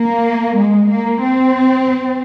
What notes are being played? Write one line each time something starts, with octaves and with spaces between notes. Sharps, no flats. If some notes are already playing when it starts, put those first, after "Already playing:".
Already playing: A#3
G#3
A#3
C4